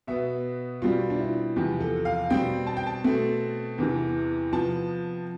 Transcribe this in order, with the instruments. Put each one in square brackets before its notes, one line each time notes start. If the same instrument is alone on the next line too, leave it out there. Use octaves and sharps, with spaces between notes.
[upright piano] B2 B3 E5
B2 G3 C4 F4
D4
E4
E2 C3 F3 G4
A4
F5
B2 G3 C4 G5
A5
G5
A5
B2 A3 C4
E2 C3 E3
C3 F3 B3 A5